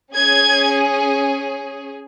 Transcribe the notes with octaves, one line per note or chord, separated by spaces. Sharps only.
C#4 G#4 G#6